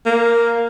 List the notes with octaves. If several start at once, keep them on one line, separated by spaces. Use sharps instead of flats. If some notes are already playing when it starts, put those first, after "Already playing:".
A#3